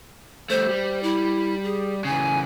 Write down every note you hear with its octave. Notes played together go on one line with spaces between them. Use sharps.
G3 A3 C5
G3
E4
G#4
C#3 E3 G#5